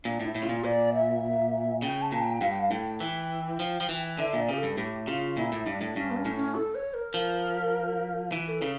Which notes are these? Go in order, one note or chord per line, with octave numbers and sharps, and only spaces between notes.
A#2 D4
A2 E4
A2
C#3 F4
A#2
A#2 D5
E5
C#3 G5
A5
A#2
G5
G2 F5
G5
F5
A2 G5
E3 G5
F3
F3
E3
D3 E5
A#2 D5
C#3 G4
A4
G2
A2 G4
C#3 F4
A#2 E4
A2
G2 D4
A2
G2 C#4
A#3
C#4
A2
C#4
A4
C#5
A#4
F3
E3
A#4
A4
C#3